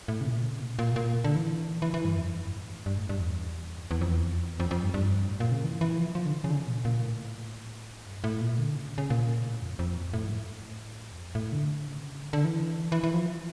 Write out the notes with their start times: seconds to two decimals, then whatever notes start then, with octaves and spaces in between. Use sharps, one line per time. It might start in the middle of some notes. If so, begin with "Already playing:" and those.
0.08 A2
0.21 C#3
0.26 A#2
0.43 C#3
0.61 A#2
0.79 A#2
0.96 A#2
1.24 D3
1.36 E3
1.82 E3
1.94 E3
2.05 G2
2.17 F2
2.34 G2
2.51 A2
2.86 G2
2.97 A2
3.09 G2
3.20 E2
3.91 E2
4.01 F2
4.11 E2
4.25 F2
4.60 F2
4.71 F2
4.83 G2
4.94 G2
5.28 A2
5.40 A#2
5.51 C#3
5.64 E3
5.81 E3
5.99 F3
6.15 F3
6.26 D3
6.33 E3
6.44 C#3
6.51 D3
6.55 C#3
6.67 A#2
6.85 A#2
7.03 A2
8.06 G2
8.24 A2
8.41 A#2
8.58 D3
8.76 C#3
8.98 C#3
9.10 A#2
9.44 A2
9.62 F2
9.79 F2
10.14 A2
10.26 G2
10.31 A2
11.12 E2
11.18 F2
11.35 A2
11.52 D3
11.87 C#3
12.22 D3
12.33 D3
12.45 E3
12.92 E3
13.04 E3
13.14 F3